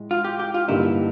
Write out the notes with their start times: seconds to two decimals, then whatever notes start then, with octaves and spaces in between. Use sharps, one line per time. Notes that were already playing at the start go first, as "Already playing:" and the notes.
Already playing: A2 G#3
0.11 F4
0.24 G4
0.39 G4
0.54 F4
0.68 G2 D3 G3 A#3 D#4 E4